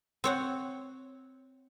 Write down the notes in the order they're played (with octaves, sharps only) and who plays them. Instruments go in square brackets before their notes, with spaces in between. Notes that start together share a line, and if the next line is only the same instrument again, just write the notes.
[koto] C4 C#5 F#5